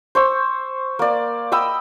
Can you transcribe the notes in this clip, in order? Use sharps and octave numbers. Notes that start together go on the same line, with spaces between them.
C5 C#6 E6
A#3 D5
D#5 G5 B5 E6